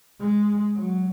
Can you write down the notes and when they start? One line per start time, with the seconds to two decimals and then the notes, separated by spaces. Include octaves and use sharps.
0.20 G#3
0.75 F#3